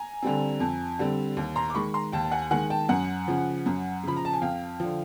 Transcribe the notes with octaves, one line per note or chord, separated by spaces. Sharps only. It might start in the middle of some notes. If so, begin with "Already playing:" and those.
Already playing: G#5 A#5
D3 G3 C4
F2
D3 G3 C4
D#2
A#5 C6
D6
D#3 G#3 B5 C#6
A#5 C6
D#2 G5 A5
A5
F#5 G#5
D#3 G#3 F#5 G#5
G5 A5
F#2 F#5 G#5
C#3 F3
F#2
C#3 F3 B5
A#5
A5
G#5
F2 F5 G5
D3 F3